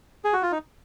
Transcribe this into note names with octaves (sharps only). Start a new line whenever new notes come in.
G#4
F#4
F4
D#4